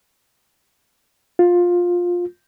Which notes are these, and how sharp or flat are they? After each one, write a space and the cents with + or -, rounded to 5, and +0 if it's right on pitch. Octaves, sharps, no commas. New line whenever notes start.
F4 +15